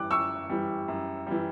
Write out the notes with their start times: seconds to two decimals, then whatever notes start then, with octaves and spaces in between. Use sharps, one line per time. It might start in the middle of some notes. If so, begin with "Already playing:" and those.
Already playing: F#2 E3 G3 D6 F#6
0.11 F#2 C#6 E6
0.49 E3 G3
0.88 F#2
1.27 E3 G3